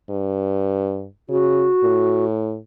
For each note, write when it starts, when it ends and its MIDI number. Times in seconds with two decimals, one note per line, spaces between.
0.10 1.06 43
1.29 1.68 49
1.29 2.25 66
1.84 2.57 45